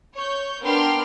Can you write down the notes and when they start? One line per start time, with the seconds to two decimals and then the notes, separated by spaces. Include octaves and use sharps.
0.14 C#5 C#6 G6
0.62 B3 D4 A#4 G5 C6 F6